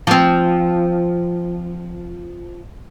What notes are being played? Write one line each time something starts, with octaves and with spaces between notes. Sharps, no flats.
F3 C4